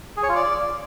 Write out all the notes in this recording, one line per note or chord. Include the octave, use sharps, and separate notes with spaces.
G#4
C#5
F4
D5